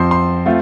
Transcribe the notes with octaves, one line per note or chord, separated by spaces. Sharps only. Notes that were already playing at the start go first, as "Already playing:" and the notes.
Already playing: F2 F3 C4 C6
C6
A3 C4 F4